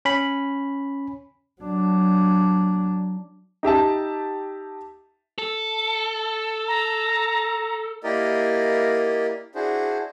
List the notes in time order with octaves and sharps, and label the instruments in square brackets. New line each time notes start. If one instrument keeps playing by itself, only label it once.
[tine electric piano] C#4 B5
[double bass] F#3 D4
[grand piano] D#4 G4 E5 A5
[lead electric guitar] A4
[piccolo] A#5
[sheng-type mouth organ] A#3 E4 G4 A#4 D5 D#5
D4 E4 F#4 G#4 C5